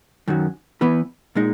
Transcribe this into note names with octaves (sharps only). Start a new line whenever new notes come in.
F#2 D#3 F#3
E3 B3 E4 B4
A#2 G#3 D#4